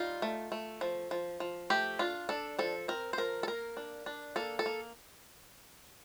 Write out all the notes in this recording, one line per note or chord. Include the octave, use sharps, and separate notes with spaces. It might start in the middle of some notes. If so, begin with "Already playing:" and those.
Already playing: G3 D#4 F4
A3
A3
F3
F3
F3
A3 G4
D4 F4
D4 A4
F3 A4
C4 A#4
C5
F3 A#4
A4
A#3 A#4
D4
D4
A#3 A4
A4
A#3